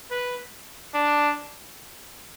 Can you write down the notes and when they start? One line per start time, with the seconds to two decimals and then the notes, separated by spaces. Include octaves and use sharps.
0.11 B4
0.94 D4